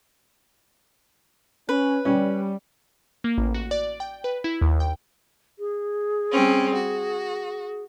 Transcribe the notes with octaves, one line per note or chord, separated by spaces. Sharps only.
C#4 B4
G3 C#4
A#3
A1
F#4
D5
G5
B4
E4
D#2
G5
G#4
G3 C4 C#4
F#4